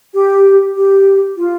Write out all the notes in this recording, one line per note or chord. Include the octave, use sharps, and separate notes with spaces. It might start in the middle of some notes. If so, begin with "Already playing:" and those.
G4
G4
F4